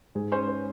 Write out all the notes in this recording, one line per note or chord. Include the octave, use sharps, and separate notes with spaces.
G#2 G#4
C#4 C5
C5